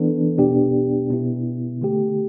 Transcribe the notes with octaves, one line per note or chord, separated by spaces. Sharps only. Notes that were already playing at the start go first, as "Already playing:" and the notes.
Already playing: E3 B3 D4 A4
E2 B2 B3 D4 G4
B2 B3 E4
D3 A3 G4